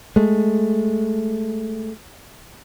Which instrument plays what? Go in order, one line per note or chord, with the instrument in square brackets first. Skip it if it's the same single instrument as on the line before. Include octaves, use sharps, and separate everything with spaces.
[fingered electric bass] G#3 A3